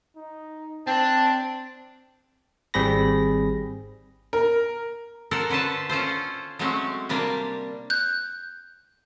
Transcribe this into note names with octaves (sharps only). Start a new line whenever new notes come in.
D#4
C4 D4 A5
G#1 G3 C4 G#4 B5 A#6
A#4
A4 A#4 C5 D5 F#5
D3 C#4 B4 C5 A5
C#4 F4 A4 C5
F#3 G#3 A3 C4 C#4
C3 G3 A#3 D4
F#6 G6